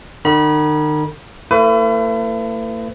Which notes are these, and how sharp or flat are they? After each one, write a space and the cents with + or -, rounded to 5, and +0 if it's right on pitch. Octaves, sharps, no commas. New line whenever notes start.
D#3 -40 B5 -30
A3 +45 E4 +15 B4 +35